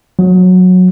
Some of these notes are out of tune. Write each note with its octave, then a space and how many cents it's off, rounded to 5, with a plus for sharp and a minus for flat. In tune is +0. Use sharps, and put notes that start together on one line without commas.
F#3 -15